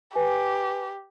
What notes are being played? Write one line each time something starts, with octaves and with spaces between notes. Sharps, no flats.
G4 B4 G#5